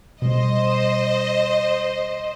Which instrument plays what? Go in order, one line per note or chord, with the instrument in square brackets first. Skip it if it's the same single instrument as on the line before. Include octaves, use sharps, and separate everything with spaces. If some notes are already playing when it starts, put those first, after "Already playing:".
[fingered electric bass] B2 G3 [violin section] C5 D#5